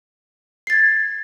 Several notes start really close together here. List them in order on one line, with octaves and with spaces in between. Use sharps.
C7 A6 G#6